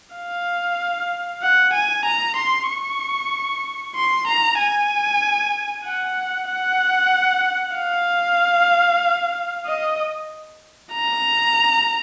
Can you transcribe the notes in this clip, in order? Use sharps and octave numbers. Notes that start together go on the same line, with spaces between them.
F5
F#5
G#5
A#5
C6
C#6
C6
A#5
G#5
F#5
F#5
F5
D#5
A#5